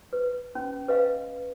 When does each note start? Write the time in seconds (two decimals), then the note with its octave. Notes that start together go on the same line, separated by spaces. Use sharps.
0.13 B4
0.55 C#4
0.88 B4 D#5 F5